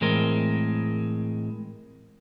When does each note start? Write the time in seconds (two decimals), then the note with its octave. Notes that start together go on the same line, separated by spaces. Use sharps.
0.01 A2 E3 G#3 C4 A#4 C6